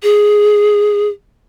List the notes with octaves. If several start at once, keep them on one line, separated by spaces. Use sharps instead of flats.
G#4